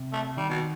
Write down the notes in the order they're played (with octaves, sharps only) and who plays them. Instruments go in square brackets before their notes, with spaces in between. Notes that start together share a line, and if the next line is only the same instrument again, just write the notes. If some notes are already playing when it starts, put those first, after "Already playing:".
Already playing: [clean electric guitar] C3
[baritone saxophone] A3
[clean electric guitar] D#3 [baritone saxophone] G3
[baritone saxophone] B2